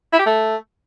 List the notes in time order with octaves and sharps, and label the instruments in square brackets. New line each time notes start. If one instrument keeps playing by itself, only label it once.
[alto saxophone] E4
G4
A3